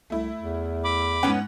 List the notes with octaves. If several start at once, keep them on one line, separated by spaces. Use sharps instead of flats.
C2 A3 E4
E2
B5 D6
G#2 B3 C#4 F#5